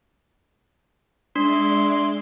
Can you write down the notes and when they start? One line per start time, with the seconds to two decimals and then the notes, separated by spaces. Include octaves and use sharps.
1.36 G#3 D4 D5 E5 C6